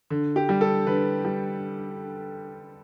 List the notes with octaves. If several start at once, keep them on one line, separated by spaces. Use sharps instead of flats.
D3
G4
G3
A4
D3 B4
G3